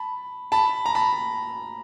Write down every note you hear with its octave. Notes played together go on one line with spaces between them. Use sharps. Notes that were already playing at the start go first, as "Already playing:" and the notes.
Already playing: A5 B5
A5 B5
A#5
A5 B5